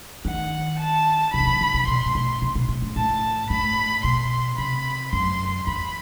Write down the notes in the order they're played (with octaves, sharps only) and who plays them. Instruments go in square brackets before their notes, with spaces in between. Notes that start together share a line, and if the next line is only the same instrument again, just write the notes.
[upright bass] D#3 [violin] F#5
[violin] A5
[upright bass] C3 [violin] B5
[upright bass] D#3
E3
D#3
C3
[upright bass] B2 [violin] C6
[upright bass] A2
B2
C3
B2
A2
G2
[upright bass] A2 [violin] A5
[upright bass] A2 [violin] B5
[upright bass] B2 [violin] C6
[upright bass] C3 [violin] B5
[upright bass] F#2 [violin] C6
[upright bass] E2 [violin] B5